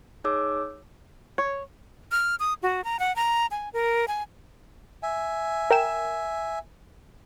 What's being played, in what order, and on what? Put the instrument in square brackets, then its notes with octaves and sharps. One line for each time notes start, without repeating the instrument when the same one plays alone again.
[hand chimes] D#4 G#4 C#5 D6 E6
[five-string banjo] C#5
[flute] F6
D#6
F#4
A#5
F#5
A#5
G#5
A#4
G#5
[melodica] E5 G#5
[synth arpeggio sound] A#4 G5 E7